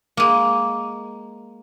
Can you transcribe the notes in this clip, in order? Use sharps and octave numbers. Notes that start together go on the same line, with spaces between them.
G#3 A#3